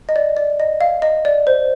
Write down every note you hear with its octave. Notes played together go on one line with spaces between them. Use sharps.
D#5
D5
D5
D#5
F5
D#5
D5
C5